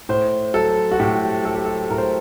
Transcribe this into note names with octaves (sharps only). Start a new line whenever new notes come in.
A2 C5
F#3 A4
F#4
A2 G4
F#3 A4
G4
A4
A2 A#4
C5